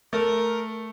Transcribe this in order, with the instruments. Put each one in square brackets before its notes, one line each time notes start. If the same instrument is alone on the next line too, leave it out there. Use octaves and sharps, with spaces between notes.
[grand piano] A3 [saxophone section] A#4